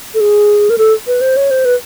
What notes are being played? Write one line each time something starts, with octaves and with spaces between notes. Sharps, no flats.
A4
G#4
A#4
A4
B4
C5
C#5
C5
B4